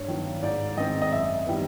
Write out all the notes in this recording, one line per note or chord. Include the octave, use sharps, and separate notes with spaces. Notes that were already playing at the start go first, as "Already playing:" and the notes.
Already playing: G2 C#5
D#3 F#3 B3
G#2 D5
D#3 G#3 C4 D#5
D#5
F#2 E5
D#3 G3 B3